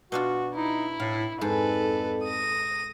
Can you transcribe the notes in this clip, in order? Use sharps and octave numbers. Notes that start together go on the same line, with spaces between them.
B2 D4 F4 F#4
D#4 E4
A2 F5
F2 G#2 A4 B4
D#6 A#6